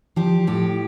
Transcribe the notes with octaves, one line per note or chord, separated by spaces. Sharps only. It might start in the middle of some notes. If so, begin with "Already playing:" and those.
F3 G4
A2 G4